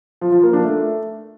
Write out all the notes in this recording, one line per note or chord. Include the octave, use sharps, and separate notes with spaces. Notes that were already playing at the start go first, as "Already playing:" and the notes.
F3
F3
A#3
D4
A3